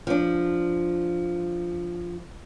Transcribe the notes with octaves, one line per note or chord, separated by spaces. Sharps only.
F3 D4